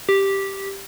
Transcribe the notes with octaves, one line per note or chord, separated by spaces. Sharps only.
G4